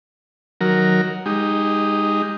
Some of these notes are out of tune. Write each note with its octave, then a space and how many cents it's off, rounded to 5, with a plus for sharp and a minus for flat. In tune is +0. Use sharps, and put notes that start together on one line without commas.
D#3 +0 F#3 +0 A#4 +0
G#3 -25 D#4 +0 G4 +0